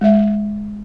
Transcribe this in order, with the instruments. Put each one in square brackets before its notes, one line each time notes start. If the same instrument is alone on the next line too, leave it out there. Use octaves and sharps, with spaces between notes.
[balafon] G#3 E5